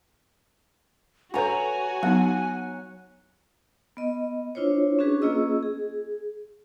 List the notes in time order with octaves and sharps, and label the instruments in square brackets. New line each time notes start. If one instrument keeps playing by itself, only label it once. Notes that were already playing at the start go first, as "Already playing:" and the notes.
[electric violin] F#4 [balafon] A4 B4 F#5 [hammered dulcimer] C#5 A#5 [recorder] G#5
[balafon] F#3 B3 D#4 [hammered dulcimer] F#5
[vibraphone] B3 D#5
D4 E4 F4 C5 C#5
C#4 D4 F#4 G#4 B4
A#3 C#4 F4 G#4 D#5 E6
G#4